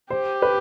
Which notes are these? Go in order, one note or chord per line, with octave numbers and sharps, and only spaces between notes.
G4 C5
B4